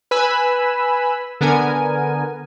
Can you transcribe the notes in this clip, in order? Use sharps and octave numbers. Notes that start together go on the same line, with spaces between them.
B4 G#5 B5 E6
D3 B3 A#4 G#5